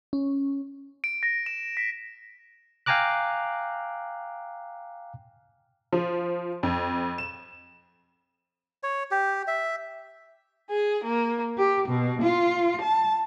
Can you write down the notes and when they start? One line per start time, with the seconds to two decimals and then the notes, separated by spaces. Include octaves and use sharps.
0.13 C#4
1.04 D7
1.23 A#6
1.46 E7
1.77 B6
2.86 F5 G5 G#5 A#5 D6 F#6
5.93 F3
6.63 F2
7.18 E7
8.83 C#5
9.11 G4
9.47 E5
10.70 G#4
11.04 A#3
11.57 G4
11.88 B2
12.21 F4
12.80 A5